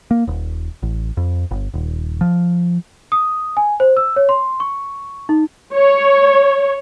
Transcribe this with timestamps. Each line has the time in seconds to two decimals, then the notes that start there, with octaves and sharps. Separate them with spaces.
0.11 A#3
0.27 D#1
0.83 A1
1.17 F2
1.51 G1
1.74 D#1
2.21 F3
3.12 D#6
3.57 G#5
3.80 C5
3.97 E6
4.16 C#5
4.29 C6
4.60 C#6
5.29 D#4
5.74 C#5